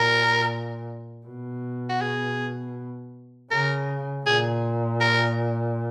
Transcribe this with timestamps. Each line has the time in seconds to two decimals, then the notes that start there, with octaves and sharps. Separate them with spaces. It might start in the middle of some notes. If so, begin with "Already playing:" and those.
Already playing: A#2 A#4
1.27 B2
1.89 F#4
2.02 G#4
3.51 C#3 A#4
4.26 A#2 G#4
5.01 A#4